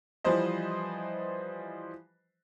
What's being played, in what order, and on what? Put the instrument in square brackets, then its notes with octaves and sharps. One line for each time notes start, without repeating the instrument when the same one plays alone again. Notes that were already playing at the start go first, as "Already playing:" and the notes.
[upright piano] E3 F3 G3 B4 C5 D#5